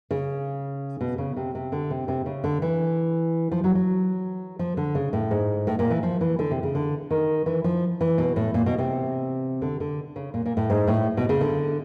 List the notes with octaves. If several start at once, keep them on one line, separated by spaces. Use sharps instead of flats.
C#3
B2
C#3
C3
C3
D3
C3
C3
C#3
D3
E3
F3
F#3
F#3
F3
D3
C#3
A2
G#2
A2
A#2
E3
F3
E3
D3
C3
C#3
D3
D#3
E3
F3
E3
B2
A2
A#2
B2
C3
D3
D3
C#3
A#2
A#2
A2
G#2
A2
B2
C#3
D3